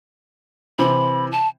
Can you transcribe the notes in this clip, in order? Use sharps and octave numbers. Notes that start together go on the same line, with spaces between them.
C3 E3 C4 B5
A5